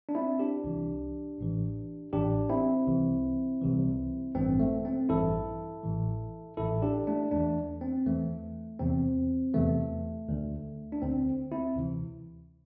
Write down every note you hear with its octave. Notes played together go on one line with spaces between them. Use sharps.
D4
C4 E4
D4 G4
C2 C3 E3
A1 A2 E3
A1 A2 E3 D4 G4
C4 E4
C2 C3 E3
C2 C3 E3
A1 G2 E3 C4
A3
C4
A1 G2 E3 E4 A4
A1 A2 E3
A1 A2 E3 E4 A4
D4 G4
A3 D4
E2 E3 A3 D4
C4
E2 E3 A3
E2 C3 E3 C4
E2 C3 E3 A3
D2 D3
D4
D2 D3 C4
C4 E4
D2 C3 E3